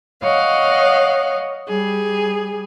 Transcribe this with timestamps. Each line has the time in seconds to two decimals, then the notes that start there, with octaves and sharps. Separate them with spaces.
0.22 C#5 D#5 F5 F#5
1.67 G3 G#4